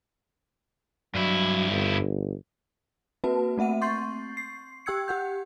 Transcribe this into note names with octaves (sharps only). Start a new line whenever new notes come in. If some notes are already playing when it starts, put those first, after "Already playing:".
G2 F#3 E4
G1
A#3 C4 F#4 B4 A5
A3 C4 E5 F#5 D#7
C6 C#6 G6 A6 C7
C7
G4 G5 E6 G#6 C#7
G4 F#5 G6